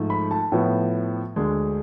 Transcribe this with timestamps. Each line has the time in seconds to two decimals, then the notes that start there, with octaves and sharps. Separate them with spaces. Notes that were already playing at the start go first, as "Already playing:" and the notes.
Already playing: G#2 F3 A3
0.10 B5
0.31 A5
0.52 A2 F3 B3
1.36 D2 D3 G#3